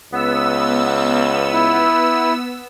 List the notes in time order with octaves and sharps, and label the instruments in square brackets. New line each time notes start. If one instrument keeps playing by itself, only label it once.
[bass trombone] C#2 [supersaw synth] B3 E6
[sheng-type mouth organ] E4